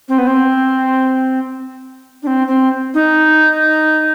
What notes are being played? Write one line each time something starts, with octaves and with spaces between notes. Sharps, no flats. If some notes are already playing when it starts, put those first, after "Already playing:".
C4
B3
C4
D4
C4
C4
D#4